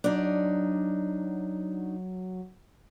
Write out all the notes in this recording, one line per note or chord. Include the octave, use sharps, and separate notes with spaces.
F#3 D4 D#4